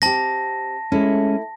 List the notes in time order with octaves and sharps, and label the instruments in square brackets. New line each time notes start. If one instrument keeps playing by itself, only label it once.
[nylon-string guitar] C4 G4 [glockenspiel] A5 A#6
[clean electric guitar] G#3 C#4 [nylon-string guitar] A3 E4 A4